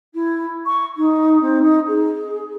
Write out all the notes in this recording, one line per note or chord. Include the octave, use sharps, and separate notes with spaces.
E4
C#6
D#4
C4
D#4
G#4